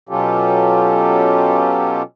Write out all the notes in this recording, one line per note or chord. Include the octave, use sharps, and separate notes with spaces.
B2 F#3 C#4 F4 G4 A4